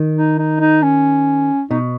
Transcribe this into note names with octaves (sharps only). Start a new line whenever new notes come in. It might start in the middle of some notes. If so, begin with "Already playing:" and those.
Already playing: D#3
D#4
D#4
D#4
C#4
B2 D#4